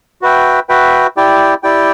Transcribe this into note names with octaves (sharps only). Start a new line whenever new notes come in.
F#4 B4 E5 G5
F#4 B4 E5 G5
E4 G4 D5 G5
E4 G4 D5 G5